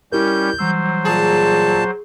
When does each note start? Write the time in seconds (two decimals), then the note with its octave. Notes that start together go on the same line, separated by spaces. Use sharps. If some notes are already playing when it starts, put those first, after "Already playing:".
0.12 G3 C#4 E4 G4 A#4 G6
0.59 E3 F#3 G3 C5 E6
1.05 A#2 G#4 A5